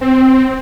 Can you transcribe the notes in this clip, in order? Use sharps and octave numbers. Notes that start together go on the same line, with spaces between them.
C4